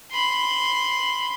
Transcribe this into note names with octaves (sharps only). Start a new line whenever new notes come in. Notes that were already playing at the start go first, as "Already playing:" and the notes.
B5 C6